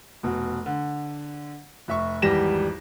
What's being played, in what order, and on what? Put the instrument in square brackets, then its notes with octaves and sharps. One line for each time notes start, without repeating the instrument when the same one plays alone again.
[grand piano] F1 B2
D3
F1 E5 C#6
G#1 E2 G3 G4 A#6 E7